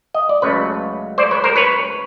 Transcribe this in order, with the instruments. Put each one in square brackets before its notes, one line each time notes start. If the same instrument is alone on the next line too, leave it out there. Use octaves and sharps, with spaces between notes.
[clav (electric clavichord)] D#5
D5
C#2 C#3 F#3 A3 B4 C#5
C5 D5
B4 C#5
A#4 C5
B4 C#5